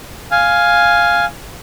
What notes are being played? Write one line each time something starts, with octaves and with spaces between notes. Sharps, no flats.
F5 G#5